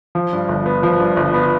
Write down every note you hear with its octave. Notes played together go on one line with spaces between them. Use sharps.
F3
G2
G1
B3
F3
G2
G1
B3